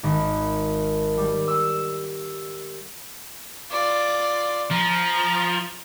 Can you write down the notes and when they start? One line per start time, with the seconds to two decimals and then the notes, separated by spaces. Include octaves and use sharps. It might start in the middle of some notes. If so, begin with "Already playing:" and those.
0.03 G#1
1.17 G3
1.48 E6
3.71 F4 D5
4.71 F3 A#5